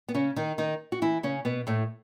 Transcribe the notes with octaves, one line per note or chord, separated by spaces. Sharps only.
B3
C#3 C#4
D#3 D#4
D#3 D#4
F#4
E3 E4
C#3 C#4
B2 B3
A2 A3